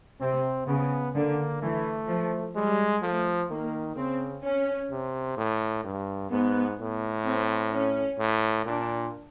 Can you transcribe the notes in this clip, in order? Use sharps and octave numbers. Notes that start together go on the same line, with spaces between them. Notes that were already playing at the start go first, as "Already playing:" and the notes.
C3 C4
C#3 B3
D3 A#3
E3 A3
F3
G3 G#3
F3 A3
D#3 A#3
C#3 C4
C#4
C3
A2
G2
G#2 B3
A2
C4
C#4
A2
A#2 D4